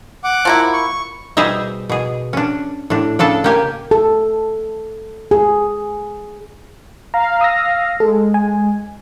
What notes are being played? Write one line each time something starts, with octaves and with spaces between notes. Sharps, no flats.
F#5 D6
F3 A#3 E4
C#6
B2 G3 G#4 C5 D#5 E5
B2 G#4
C#4 D4
A2 D4
C#3 D4 A4 A5
A#3 G4 G#5
A4
G#4
F5 A#5
D#6 E6 A#6
G#3 A4
G#5